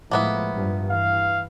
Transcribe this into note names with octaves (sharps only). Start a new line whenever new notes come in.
A2 F3 G#3 A#3 B3 E4
G2 F3
E3 F5